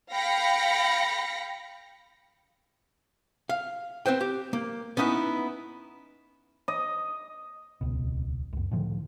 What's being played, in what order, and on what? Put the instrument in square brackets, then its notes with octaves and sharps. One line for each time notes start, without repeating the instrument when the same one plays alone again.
[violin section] F5 G5 B5 A#6 B6 C#7
[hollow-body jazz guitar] F5
C4 B4 C5 G5
G4
A#3
B3 C#4 D#4 E4 B4
[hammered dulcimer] D#5
[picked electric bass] D#1 C#2 B2
C#2 F#2
A2 D3 D#3 F3